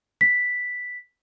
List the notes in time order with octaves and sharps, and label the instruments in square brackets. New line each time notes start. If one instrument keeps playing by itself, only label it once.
[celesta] B6